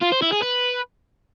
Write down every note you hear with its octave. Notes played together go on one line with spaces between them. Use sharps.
F4
C5
E4
G#4
B4